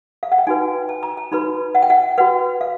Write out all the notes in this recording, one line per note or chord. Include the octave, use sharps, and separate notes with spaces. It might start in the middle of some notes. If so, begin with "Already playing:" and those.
F5
F#5
G5
D#4 F#4 B4 G#5
A5
A#5
A5
D#4 F#4 B4 B5
F#5
G5
F#5
F#4 B4 F#5
F5